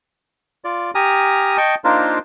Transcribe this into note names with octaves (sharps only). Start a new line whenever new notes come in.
F4 D5
G4 G#5 A#5 D#6 F6
D#5 G5 A5 C#6
A#3 D4 D#4 F4 A#4 C5